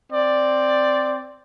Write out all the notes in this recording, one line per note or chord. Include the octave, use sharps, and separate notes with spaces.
C4 D5